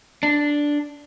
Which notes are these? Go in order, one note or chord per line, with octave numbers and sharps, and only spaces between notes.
D4